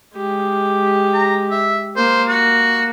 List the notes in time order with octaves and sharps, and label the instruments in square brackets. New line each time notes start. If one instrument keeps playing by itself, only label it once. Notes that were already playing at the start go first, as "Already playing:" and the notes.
[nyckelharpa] G#3 G4
[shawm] A#5
E5
[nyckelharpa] A#3 [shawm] C5
[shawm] F#4